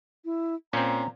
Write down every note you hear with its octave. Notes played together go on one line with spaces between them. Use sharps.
E4
A#2 C4 C#4 A#5